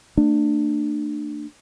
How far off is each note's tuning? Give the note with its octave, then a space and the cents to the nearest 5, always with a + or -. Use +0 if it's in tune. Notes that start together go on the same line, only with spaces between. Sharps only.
A3 +40 D4 +20